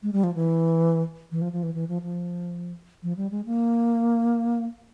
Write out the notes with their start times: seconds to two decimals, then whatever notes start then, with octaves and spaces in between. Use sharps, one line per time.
0.03 G#3
0.13 G3
0.24 F3
0.35 E3
1.32 E3
1.42 F3
1.53 F3
1.63 E3
1.75 E3
1.88 F3
2.02 F3
3.03 F3
3.17 G3
3.31 G#3
3.46 A#3